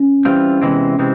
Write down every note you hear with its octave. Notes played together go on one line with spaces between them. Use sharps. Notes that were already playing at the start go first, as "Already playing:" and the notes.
Already playing: C#4
E3 G3 C4 F4
E2 C3 E3 G#3 C4
C3 E3 G#3 C4